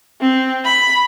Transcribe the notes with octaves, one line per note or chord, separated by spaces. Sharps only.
C4
B5